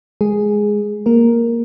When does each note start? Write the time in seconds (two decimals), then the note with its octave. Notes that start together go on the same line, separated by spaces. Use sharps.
0.21 G#3 G#4
1.06 A#3 A#4